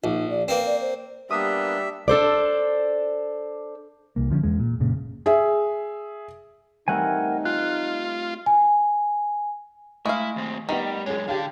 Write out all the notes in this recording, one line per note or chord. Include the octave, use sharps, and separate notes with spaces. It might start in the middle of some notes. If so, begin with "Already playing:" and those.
A#1 D#4
D5
A#3 C4 B4
D5
C5
G3 A#3 B3 D4 E5 D#6
D4 A4 C5 D5
C2 A#3
D3 F3 B3 C#4
E2 G#3
A#2
F#1 A#2 C#3
G#4 E5
G3 A3 C4 D#4 A#4 F#5 G#5
F4 F#6
G#5
G#3 A3 E4 F5 D#6
D#2 C4
D#3 G3 B3 D#5 G5
F#2 G#3 C#4 G#4 C#5
D3 G4 A4 F5